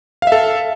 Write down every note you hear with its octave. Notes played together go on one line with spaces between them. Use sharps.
A4 E5 F5